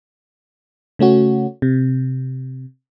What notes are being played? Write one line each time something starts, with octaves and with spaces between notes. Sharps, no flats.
C#3 A3 C#4 F#4
C3